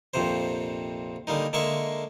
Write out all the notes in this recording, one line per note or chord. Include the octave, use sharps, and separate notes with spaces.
A#1 F2 C3 C5
D3 G3 A#3 D#4
D3 G#3 A#3 E5 C#6